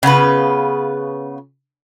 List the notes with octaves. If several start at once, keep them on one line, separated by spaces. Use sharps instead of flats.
C#3 B3 F4 B4